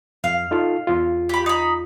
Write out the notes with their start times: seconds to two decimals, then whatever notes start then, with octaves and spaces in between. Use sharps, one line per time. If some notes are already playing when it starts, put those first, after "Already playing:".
0.24 F2 F5
0.51 D#4 F4 A4
0.87 E2 F4
1.29 G4 B5
1.46 D#4 B5